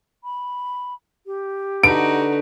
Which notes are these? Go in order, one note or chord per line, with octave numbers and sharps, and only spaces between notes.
B5
G4
D3 D#4 F#4 B4 D7